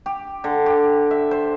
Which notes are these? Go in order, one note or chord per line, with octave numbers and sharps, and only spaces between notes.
G4
D3
G4
E5
C5